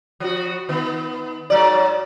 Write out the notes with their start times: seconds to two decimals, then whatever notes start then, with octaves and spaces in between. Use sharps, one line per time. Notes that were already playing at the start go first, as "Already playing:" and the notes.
0.20 F3 F#4
0.69 D#3 B3
1.50 G#2 F#3 D5